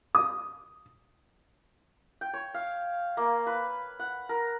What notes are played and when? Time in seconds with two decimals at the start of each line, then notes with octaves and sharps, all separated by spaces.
0.15 D#6
2.21 G5
2.34 C#5
2.54 F5
3.17 A#3
3.47 B4
4.00 F#5
4.29 A#4